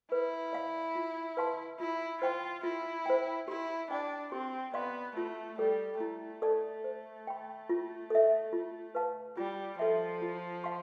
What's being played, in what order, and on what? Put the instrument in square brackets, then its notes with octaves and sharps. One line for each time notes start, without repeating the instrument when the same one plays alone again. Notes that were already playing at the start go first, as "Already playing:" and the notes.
[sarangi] E4 [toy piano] B4
[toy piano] D5 F5 B5
F4
B4 F5 A5 C6
[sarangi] E4 [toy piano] F4
[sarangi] F4 [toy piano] C5 G5 B5
[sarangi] E4 [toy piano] F4
[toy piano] C5 G5
[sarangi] E4 [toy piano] G4
[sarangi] D4 [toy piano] D5 G5
[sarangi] C4 [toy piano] G4
[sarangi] B3 [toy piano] D5 F5 C6
[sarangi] A3 [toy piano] F4
[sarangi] G3 [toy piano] A4 D5
[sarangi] A3 [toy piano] E4
[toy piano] A4 D5 A5
C5
G5 B5
F4
A4 E5
F4
B4 F5 A5
[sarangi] G3 [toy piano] F4
[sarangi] F3 [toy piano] A4 E5
[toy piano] F4
F5 A5 C6